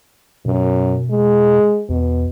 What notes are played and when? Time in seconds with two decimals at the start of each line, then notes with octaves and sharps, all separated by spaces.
0.46 F#2 B2
1.11 G#3
1.89 E2 B2